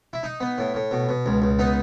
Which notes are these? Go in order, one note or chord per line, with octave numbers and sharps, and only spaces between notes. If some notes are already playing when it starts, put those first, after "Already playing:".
E4
D#4
B3
A2
A2
B2
B2
C#2
C#2
B3 D#4